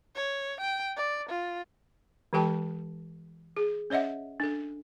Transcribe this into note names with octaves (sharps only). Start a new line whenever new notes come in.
C#5
G5
D5
F4
E3 G#3 G4 A4 G5 A5
G#4
C#4 C#5 D#5 E5 F#5
D4 A4